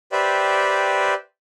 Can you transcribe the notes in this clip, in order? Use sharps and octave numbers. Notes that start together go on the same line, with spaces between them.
G4 B4 C5 D5 E5 G5